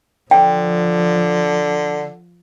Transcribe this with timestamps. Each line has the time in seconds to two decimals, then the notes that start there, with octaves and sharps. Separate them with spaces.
0.31 D3 F3 G5